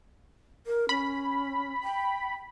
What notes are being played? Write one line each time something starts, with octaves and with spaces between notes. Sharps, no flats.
A#4
C#4 B5
G5